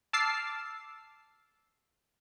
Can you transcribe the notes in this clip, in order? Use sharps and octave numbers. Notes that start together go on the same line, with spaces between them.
A5 D6 E6 F6 A6 C7